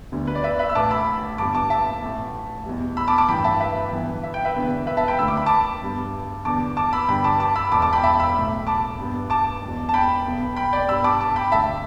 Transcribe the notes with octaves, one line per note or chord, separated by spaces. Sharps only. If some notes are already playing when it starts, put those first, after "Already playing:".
D2 D3 G3 B3
B4
D5
B4 E5
B4 E5
E6
A1 A2 A3 A5 D6
B5 E6
G1 G2 G3 B3 A5 D6
A5 D6
E5 A5
A1 A2 A3
E2 B2 G3
B5 E6
A5 D6
A5 D6
A1 G2 E3 G5 B5
E5 A5
B4 E5
G1 G2 E3 B3
E5
G5
B4 E5
E1 E2 D3 B3
B4 E5
E5 A5
G5 B5
D2 D3 A3 E6
D6
B5
A5 D6
G2 G3 B3
E2 D3 B3 A5 D6
A5 D6
B5 E6
G2 D3 G3 B3 G5 B5
A5 D6
A5 D6
B5 E6
E1 E2 B2 A5 D6
A5 D6
G5 B5
E5 A5
B5 E6
B1 A2 A3
A5 D6
G2 G3 B3
A5 D6
E1 E2 B2
A5
G5 B5
B1 B2 B3
G5 B5
D5 G5
G2 G3 B3 B5 E6
A5 D6
A5 D6
G5 B5
D2 D3 A3 E5 A5